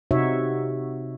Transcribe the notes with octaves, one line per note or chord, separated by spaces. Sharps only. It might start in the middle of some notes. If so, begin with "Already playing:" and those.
C3 D#4 F#4 C#5 E5